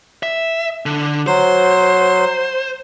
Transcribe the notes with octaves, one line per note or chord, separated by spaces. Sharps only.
E5
D3
F#3 C5 C6